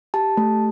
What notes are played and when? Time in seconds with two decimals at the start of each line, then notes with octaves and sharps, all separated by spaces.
0.14 G4 A5
0.37 A3